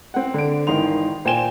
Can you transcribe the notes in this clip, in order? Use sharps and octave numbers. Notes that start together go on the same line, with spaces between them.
C4 F#5
D3 D7
G#1 D#3 E3 D#4 C6 F7
A#2 C5 G5 G#5 E7 G7